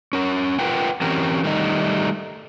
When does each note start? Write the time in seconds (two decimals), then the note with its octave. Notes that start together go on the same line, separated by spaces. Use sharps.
0.13 C#4 A#4
0.59 F4 A#4 B4 F#5 G5
1.01 E3 C4 C#4 G4 A#4 A#5
1.44 D#3 G3 A3 D#4